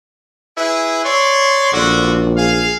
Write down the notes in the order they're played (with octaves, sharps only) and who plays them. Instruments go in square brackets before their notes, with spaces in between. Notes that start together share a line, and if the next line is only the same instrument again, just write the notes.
[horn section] E4 G#4 B4
C#5 D5 C6
[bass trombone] A#1 [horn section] D3 F4 F#4
[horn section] G#4 F5